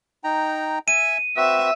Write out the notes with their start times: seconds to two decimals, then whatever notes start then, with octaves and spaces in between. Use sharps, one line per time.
0.24 D#4 G5 A#5
0.88 E5 G#5 E6 D#7
1.37 C4 F#4 B4 E5